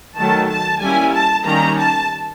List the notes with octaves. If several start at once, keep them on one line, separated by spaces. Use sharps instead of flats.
D#3 F#3 A3 A5
A5
G3 A#3 C#4 E4 G#5
A5
D#3 G3 A#3 C#4 A#5
A5